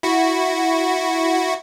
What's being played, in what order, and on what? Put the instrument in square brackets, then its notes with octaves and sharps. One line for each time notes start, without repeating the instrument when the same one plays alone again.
[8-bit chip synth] E4 F#4